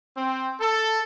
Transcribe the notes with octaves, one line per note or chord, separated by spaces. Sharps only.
C4
A4